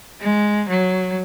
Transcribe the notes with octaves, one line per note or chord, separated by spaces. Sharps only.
G#3
F#3